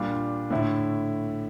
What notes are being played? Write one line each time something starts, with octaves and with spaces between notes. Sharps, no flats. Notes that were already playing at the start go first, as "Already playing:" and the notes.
Already playing: A#2 G3 D4 F4
A2 D3 A3 E4